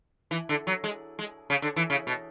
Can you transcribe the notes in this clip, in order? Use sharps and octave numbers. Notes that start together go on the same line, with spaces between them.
E3
D3
F#3
G#3
G#3
C#3
D3
E3
C#3
B2